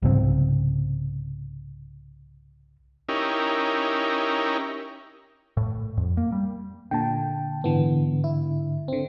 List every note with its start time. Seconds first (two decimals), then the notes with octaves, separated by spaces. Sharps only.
0.02 C2 G#2 C#3 C4
3.09 C#4 D#4 E4 G4 A#4
5.57 A2
5.97 F2
6.17 A#3
6.32 G3
6.91 A#2 D3 G5 A5
7.64 G#2 D3 E3 B3
8.24 E4
8.88 D3 C4